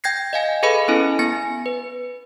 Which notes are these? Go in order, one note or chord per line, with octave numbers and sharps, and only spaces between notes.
G5 G6 G#6 A#6 C7
D#5 F5 G#5
G#4 A4 B4 D#5 F5 B5
B3 C#4 E4 A4 G#5
B3 G#5 A#6
B4